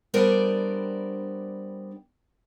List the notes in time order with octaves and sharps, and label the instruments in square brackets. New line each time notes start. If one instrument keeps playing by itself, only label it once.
[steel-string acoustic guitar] G3 B3 D4 A#4 C5 D5